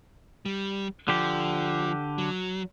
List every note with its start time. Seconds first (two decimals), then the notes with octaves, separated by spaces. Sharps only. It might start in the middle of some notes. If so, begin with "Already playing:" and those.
0.46 G3
1.08 D3 F3 G4
2.18 F#3